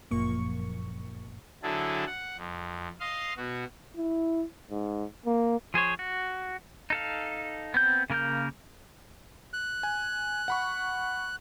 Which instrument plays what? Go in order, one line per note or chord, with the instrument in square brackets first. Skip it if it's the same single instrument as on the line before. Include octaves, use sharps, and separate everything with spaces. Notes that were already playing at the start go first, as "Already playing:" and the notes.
[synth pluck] G1 F#2 A#2 F3 A#3 C#6
[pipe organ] D3 F#3 E4 G#4 A4
F#5
F2
D#5 F5 C6
B2 F#4
[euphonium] E4
G#2
A#3
[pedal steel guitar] F3 G#4 C5 C#5
F#4
D#4 A4 F5
B3 C4 G6
C#3 A#3 A#4 F6 G6
[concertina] F#6
[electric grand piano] G#5
F#5 B5 C#6